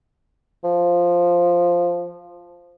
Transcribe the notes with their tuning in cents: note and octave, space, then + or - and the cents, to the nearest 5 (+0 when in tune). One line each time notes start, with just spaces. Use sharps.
F3 +0